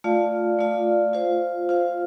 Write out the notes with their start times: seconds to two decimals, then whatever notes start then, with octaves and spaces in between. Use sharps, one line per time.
0.04 A3 F4 D5 F5
0.59 A3 F4 D5 F5
1.13 F4 C5 F5
1.69 F4 C5 F5